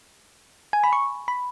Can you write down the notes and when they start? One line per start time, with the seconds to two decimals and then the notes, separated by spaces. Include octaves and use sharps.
0.73 G#5
0.84 B5
0.93 C#6
1.28 B5